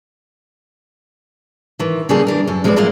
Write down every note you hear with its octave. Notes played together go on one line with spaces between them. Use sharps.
D#3 E3
C#3 G3 A#3 F4 G#4 A4
E3 D4 A#4
F#2 A4
F3 G#3 C4 E4 B4 D5
F#3 G#3 A#3 E4 F4